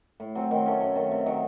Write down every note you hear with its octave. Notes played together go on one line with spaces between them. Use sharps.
A2
F#3 C4
D#3
A3 C#4
F#2
D#3 A3
C3
D#3 F#3